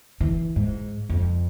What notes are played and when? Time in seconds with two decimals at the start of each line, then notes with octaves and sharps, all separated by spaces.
0.20 E3
0.56 G#2
1.09 F2